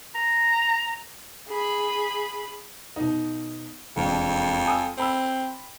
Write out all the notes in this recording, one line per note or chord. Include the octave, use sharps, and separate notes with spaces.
A#5
G#4 B5
B2 D#4
E1 F2
G#5 D#6 E6
C4 G5 B5 E6